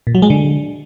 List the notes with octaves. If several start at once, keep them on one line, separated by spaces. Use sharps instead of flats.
A#2
F#3
G#3
D3